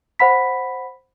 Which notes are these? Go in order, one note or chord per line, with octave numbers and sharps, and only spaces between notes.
C5 F#5 B5 B6